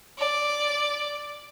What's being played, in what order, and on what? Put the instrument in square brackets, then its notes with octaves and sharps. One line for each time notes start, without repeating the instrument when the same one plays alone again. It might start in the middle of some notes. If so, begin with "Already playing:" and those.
[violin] D5